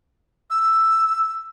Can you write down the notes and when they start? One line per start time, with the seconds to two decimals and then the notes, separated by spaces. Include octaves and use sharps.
0.50 E6